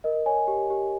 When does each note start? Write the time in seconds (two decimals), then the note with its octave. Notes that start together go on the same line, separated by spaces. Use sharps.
0.04 A#4 D#5
0.26 C#5 G#5
0.48 G4
0.70 G4